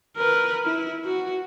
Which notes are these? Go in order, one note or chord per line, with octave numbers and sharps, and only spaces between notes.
A#4 B4
E4
F#4